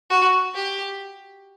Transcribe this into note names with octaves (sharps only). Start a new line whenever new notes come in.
F#4
G4